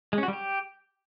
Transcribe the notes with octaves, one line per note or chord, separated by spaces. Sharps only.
G#3
C#4
F#4
G3
G4